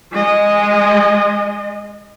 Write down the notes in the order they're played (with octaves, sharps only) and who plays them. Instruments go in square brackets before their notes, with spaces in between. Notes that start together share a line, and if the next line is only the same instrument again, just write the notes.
[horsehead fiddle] G#3 D#5